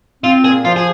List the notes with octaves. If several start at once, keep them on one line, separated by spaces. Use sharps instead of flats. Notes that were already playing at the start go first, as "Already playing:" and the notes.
C4 F4
A#2 G#4
F3 F4
G#4